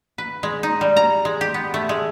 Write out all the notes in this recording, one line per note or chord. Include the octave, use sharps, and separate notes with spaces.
B4
G#3
D#4
G3
A#5
G#3
G4
B3
A3
G#3